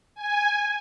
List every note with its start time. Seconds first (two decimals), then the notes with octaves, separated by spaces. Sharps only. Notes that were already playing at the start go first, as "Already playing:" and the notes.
0.15 G#5